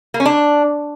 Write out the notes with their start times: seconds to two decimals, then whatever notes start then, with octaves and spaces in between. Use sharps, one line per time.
0.14 A#3
0.20 C#4
0.26 D4